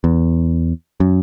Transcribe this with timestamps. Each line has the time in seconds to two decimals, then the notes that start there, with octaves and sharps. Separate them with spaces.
0.04 E2
1.00 F#2